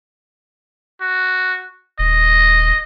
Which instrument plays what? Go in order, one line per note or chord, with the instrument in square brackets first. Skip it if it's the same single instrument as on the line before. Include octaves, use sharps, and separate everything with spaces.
[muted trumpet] F#4
[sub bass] D#1 [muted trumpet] D#5